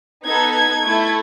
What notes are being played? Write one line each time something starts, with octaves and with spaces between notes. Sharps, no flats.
B3 D#4 A4 G#6
G#6
A3 E4 A4